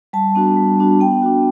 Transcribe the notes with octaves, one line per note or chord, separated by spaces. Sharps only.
G3 A5
B3 D4 F#4
G3
B3 D4 F#4
B3 G5
D4 F#4